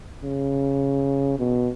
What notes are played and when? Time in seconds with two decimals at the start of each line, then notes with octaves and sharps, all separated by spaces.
0.23 C#3
1.39 B2